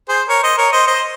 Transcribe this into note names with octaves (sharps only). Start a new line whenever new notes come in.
G#4 C5
A#4 C#5
C5 D#5
A#4 C#5
C5 D#5
C5 D#5